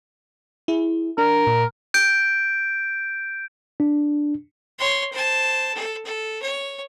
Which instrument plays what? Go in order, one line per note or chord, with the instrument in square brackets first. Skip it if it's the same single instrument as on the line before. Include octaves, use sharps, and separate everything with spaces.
[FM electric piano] E4 G#4
[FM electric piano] D4 [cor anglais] A#4
[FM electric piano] A#2
[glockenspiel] G6 D7
[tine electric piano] D4
[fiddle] C#5 C6
C5 A5
A4
A4
C#5